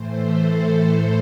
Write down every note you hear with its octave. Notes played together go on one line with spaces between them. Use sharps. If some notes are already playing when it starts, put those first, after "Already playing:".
Already playing: A2 E3 A3 C5
A4